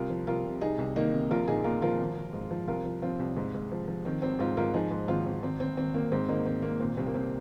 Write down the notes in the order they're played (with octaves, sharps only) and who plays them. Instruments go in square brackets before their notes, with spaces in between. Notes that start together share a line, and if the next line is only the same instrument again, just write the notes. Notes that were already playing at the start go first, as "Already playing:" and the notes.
Already playing: [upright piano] C2 F4 A#4
F3
C2 F4 A#4
C3
C2 D#4 G#4
C2
D#3 A#3 D#4
C3
A#1 F4 A#4
A#2 D#4 G#4
A#2 F4 A#4
F3 F4 A#4
G#1
G#1
G#2
F3
C2 F4 A#4
F3
F3 C4 F4
C2
G#2
G#2
F3
F3
D#3 C4
G#1 C4
G#2 C4 F4
G#2 F4 A#4
F3 D#4 G#4
G#2
G#1 C4 F4
G#1
G#1 C4
G#1 C4
G#1 C4
G#1 A#3
G#2 C4
G#1 A#3 D#4
G#1 C4
G#1 A#3
A#2 C4
C2 C4
A#3
C2 C4